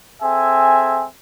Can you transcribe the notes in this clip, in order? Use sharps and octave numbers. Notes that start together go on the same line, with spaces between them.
C4 G#4 A4 E5 G#5